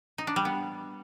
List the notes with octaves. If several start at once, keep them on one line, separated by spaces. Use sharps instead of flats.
D#4
D4
G3
B3